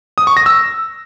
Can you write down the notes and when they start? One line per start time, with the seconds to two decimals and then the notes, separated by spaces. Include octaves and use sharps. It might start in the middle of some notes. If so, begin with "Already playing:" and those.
0.18 D#6
0.27 C#6
0.37 A#6
0.46 E6